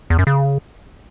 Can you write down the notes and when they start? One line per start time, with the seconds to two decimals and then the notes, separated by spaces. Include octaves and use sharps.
0.10 E2
0.19 F#2
0.27 C#3